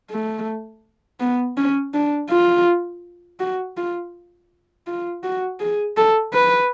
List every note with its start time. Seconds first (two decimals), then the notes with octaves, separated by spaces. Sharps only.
0.11 A3
1.20 B3
1.57 C#4
1.94 D4
2.30 F4
3.40 F#4
3.77 F4
4.87 F4
5.23 F#4
5.60 G#4
5.97 A4
6.33 B4